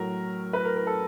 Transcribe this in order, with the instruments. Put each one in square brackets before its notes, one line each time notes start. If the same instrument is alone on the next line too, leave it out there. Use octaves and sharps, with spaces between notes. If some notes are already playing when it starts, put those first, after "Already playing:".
Already playing: [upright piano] A2 F#3 A#4
B4
A#4
A#4
A4